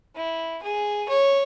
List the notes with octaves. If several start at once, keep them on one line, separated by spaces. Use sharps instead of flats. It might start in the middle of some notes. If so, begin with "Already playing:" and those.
E4
G#4
C#5